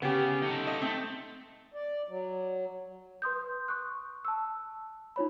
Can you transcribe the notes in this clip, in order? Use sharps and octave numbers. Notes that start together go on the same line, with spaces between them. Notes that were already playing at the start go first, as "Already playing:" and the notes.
C#3 B3 C#4 G4
D#4 A4
D#5
A3 C4
D5
F#3
B4 C6 D#6 G6
C#6 D#6 F#6
A5 E6
D#4 F4 C#5 B5